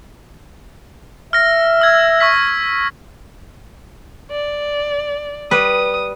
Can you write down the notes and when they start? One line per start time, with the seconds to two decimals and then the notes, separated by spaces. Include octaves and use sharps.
1.33 E5 F6 A#6
1.81 E6 G#6
2.20 C#6 E6 B6
4.31 D5
5.51 G3 B4 D#6